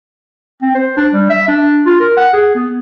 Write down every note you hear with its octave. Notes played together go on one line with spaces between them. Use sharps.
C4
C5
D4
G3
E5
D4
F4
A#4
F#5
G#4
B3